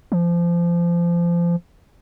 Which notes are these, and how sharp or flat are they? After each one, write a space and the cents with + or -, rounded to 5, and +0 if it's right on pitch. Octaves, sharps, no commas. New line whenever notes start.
F3 -25